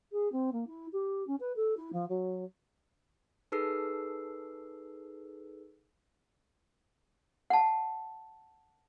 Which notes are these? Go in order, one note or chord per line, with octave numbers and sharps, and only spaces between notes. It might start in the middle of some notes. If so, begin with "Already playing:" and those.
G#4
C4
A#3
E4
G4
C#4
B4
A4
E4
F3
F#3
D#4 G#4 A4 B4 E6 C7
F#5 A5